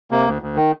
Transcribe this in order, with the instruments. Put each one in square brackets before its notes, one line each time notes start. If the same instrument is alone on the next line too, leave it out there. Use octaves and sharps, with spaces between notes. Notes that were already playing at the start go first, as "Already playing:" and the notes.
[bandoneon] C3 A#3
D2
D2
D#3